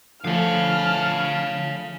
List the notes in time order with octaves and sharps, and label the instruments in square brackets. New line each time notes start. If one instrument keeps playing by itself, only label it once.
[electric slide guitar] D3 F3 A3 [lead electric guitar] C#5 F5 [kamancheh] A5 F6